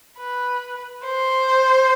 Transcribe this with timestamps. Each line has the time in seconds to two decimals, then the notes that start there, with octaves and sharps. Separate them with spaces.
0.18 B4
1.06 C5